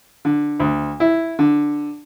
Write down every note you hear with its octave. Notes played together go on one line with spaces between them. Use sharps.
D3
D2
E4
D3